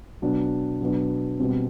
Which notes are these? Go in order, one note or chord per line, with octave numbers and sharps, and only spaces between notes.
B2 F#3 B3 D4
B2 F#3 B3 D4
B2 G3 C4